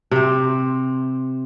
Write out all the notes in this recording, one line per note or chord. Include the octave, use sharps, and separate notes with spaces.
C3 C4